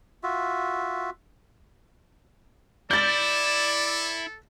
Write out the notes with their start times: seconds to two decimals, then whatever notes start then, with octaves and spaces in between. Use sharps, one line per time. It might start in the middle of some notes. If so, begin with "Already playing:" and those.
0.23 F4 F#4 E5
2.91 E4 A4 D5 G6 A6